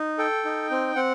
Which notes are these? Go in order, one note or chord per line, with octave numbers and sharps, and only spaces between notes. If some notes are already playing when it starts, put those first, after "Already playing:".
Already playing: D#4
A4 G5
D#4
C4
C4 F#5